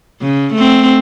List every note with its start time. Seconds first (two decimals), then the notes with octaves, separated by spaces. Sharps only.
0.22 C#3
0.54 A3 C4